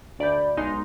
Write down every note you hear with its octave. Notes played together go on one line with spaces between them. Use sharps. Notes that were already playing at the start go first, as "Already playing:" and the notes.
D2 D5 B5 G6
B1 G#3 D#4 C6